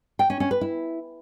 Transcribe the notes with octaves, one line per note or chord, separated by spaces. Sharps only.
G5
C#4
C#4
B4
E4